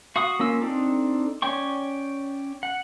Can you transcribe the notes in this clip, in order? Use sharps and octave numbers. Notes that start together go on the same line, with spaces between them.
F#4 F5 C#6 D#6
A#3 C#4 F4 E6
C4 D4 D#4 A4
C#4 C#5 D5 G5 C#6
F#5